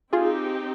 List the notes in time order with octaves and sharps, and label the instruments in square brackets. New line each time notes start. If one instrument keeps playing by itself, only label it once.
[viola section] C4 D#4 G4 [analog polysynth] F4 G#4